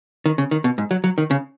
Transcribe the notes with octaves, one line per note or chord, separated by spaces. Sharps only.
D#3
C#3
D#3
B2
G#2
F#3
F#3
D#3
C#3